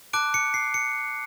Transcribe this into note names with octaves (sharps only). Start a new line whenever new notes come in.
A5 D6 F#6 D7
C#7
C7
C#7